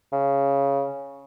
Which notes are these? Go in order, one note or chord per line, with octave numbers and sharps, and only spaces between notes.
C#3